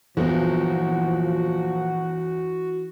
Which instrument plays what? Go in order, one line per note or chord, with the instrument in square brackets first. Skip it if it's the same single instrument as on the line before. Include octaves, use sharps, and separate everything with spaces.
[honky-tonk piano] G1 E2 [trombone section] A#2 F3 [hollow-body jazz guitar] E3 B3 [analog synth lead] F#4